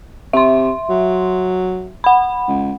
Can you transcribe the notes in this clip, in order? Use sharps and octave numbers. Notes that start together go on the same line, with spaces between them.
C3 E5 C6
F#3
F#5 B5
C#2